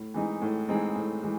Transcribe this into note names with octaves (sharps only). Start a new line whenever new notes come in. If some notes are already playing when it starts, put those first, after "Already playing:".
Already playing: A2
E3 G#3 C4 D#4
A2
E3 G#3 C4 D#4
A2
E3 G#3